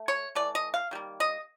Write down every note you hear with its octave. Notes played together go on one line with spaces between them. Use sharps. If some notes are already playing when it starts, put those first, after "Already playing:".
Already playing: A3
C#5
E3 A3 D5
D#5
F5
D#3 G3 A#3
D#5